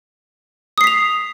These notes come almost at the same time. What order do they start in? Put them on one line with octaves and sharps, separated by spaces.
D#6 C7 B6 F7